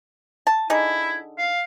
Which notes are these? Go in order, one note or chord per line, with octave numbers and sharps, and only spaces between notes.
A5
D3 D#4 E4 G#4
F5